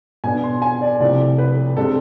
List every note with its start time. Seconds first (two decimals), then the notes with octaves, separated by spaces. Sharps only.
0.24 B2 B3 D4 G#5
0.44 C6
0.62 G#5
0.82 D5
1.00 C2 C3 F3 A3 D5
1.38 B4
1.77 C3 G#3 D4 A4